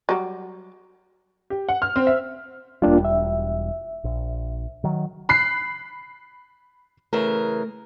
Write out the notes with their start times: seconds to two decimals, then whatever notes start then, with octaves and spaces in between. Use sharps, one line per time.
0.09 F#3 G3
1.50 G4
1.69 F#5
1.82 F6
1.96 C4
2.07 E5
2.82 E1 G3 A#3 D4 F4
3.05 E5
4.04 A#1
4.84 D#3 F#3
5.29 B5 F#6 C7
7.13 C#3 E3 A3 A#4